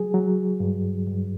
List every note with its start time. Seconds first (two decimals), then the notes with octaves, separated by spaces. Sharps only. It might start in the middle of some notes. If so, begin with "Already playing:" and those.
Already playing: F#3 G#4
0.14 F#3
0.60 G2
1.07 G2